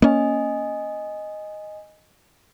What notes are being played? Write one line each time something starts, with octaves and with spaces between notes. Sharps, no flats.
A#3 C#4 D#5 G#5